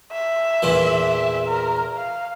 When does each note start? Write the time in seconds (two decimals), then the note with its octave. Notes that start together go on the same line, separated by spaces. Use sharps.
0.12 E5
0.62 E2 A#2 E3
1.48 A#4
1.96 F5